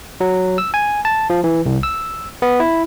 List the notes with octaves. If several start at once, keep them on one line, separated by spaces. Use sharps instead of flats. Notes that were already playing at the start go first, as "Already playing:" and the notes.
F#3
E6
G#5
A5
F3
E3
C2
E6
B3
E4